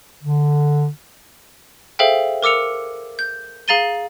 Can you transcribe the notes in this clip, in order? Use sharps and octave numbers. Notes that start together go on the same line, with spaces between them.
D3
G#4 A4 C5 E5 F5 G5
A#4 D6 E6 C#7 F7
G6
G#4 F5 A#5 A6 D#7 G7